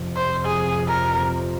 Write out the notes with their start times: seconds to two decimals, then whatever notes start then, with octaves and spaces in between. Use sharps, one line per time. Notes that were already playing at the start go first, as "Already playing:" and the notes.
Already playing: F2 C3 F3
0.16 C5
0.45 G#4
0.87 A#4